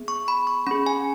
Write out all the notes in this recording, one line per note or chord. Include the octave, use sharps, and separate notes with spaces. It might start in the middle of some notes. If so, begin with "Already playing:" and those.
Already playing: B3 G#4
C#6
B5
C#6
C#4 G#4 B5
G#5